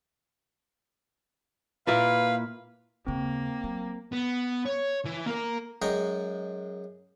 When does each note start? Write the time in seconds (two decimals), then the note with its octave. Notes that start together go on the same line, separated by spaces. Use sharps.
1.87 A#2 A#3 E4 B4 F5
3.06 D#2 C#3 A#3 C4
3.64 F#3
4.13 B3
4.66 C#5
5.05 E3
5.26 A#3 A#4
5.82 F#2 G#3 G5 A#5 C#6